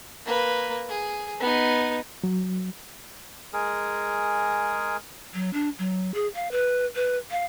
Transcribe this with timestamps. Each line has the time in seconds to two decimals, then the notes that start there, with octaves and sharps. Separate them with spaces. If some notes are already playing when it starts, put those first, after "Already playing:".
0.26 A#3 B4
0.89 G#4
1.40 B3 D#4
2.24 F#3
3.53 G#3 G#4 A#4
5.34 F#3
5.53 D4
5.79 F#3
6.14 G#4
6.35 F5
6.51 B4
6.96 B4
7.31 F5